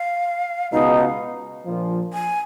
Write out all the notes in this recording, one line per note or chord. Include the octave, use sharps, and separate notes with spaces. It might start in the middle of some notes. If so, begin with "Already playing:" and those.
Already playing: F5
C#2 B2 G#3 D#4 F5
F5
A#1 A#2 F3
G#5